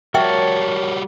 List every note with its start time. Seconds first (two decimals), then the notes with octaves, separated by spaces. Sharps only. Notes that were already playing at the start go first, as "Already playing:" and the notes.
0.15 G3 F#4 A#4 C#5 E5 G5 A5